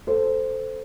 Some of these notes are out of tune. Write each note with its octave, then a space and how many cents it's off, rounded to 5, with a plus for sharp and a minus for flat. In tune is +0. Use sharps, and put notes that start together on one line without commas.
A4 +0 C5 -10